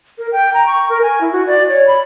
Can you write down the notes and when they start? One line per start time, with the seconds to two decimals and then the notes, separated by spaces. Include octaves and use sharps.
0.18 A#4
0.32 G5
0.54 A#5
0.66 C#6
0.89 A#4
1.02 G#5
1.21 E4
1.32 F#4
1.47 D5
1.69 C#5
1.87 B5